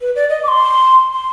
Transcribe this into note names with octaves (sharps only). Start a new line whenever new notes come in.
B4
D5
D#5
D6
C6
C6